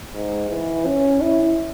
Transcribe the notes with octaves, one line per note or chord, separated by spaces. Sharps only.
G#2
E3
C#4
E4